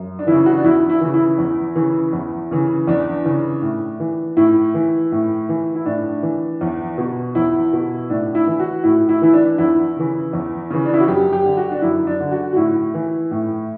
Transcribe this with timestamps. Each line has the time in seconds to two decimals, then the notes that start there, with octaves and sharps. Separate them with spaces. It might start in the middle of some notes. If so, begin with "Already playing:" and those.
Already playing: F#2
0.19 D4
0.27 C#3 E3 E4
0.46 F#4
0.57 D4
0.64 E2 E4
0.90 E4
1.01 C#3 E3
1.14 E4
1.38 E2
1.75 C#3 E3
2.13 E2
2.51 C#3 E3
2.88 E2 D4
3.25 C#3 E3
3.62 A2
4.00 E3
4.37 A2 E4
4.74 E3
5.12 A2
5.49 E3
5.75 E4
5.86 A2 D4
6.23 E3
6.61 E2
6.98 B2
7.35 E2 E4
7.73 B2
8.10 A2 D4
8.35 E4
8.47 E3
8.59 F#4
8.84 A2 E4
9.09 E4
9.22 E3 E4
9.33 D4
9.58 E2 E4
9.97 C#3 E3
10.33 E2
10.70 C#3 E3
10.86 D4
10.94 E4
11.00 F#4
11.07 F#2 G4
11.33 G4
11.45 D3
11.57 F#4
11.72 D4
11.82 F#2 E4
12.07 D4
12.20 D3
12.31 F#4
12.53 F#4
12.56 A2 E4
12.94 E3
13.31 A2